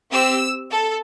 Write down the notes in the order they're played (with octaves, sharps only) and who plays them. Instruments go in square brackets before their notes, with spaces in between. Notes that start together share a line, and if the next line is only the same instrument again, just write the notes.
[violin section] C4 G4 E6
A4